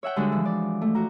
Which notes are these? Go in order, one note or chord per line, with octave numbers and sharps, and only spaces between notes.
C#5 E5 F#5 G5
D3 G3 G#3 F#4
E3 F3
D5
A3
F#4 G5 A#5